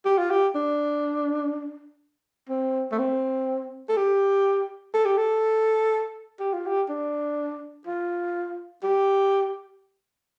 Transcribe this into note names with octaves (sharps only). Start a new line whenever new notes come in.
G4
F4
G4
D4
C4
A3
C4
A4
G4
A4
G4
A4
G4
F4
G4
D4
F4
G4